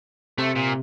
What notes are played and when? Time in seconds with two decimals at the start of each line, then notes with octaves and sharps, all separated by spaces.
0.38 C3 A3
0.56 A#2